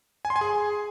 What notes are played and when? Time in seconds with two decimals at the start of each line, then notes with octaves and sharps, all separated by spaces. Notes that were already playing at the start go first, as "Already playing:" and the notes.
0.25 G#5
0.30 C6
0.36 G#5
0.41 G#4